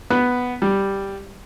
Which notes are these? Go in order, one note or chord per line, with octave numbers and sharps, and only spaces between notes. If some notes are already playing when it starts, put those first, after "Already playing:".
B3
G3